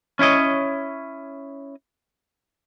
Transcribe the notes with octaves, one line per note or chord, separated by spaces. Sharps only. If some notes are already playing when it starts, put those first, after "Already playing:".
C#4 E4 C#5 D#5